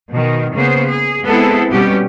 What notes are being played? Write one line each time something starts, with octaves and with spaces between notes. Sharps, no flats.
B2 D#3
C#3 A#3 B3 G#4 C5
G#4
G#3 B3 C4 E4 G#4 A4
B2 G3 B3 C#4 G4